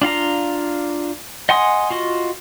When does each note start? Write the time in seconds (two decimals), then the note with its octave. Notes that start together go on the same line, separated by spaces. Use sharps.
0.02 D4 F4 F5 A#5
1.49 D#5 F#5 G#5 C6 D#6
1.90 F4 F#4 D#5